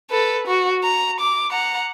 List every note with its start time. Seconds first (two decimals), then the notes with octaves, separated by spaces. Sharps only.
0.10 A4 B4
0.47 F#4
0.84 A#5
1.20 D6
1.51 F#5 A#5